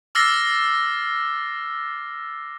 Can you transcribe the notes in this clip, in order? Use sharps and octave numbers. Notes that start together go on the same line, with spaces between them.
D6 E6 F6 A6 A#6 C7